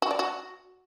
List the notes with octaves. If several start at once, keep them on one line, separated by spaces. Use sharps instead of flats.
F#4
D5
F#4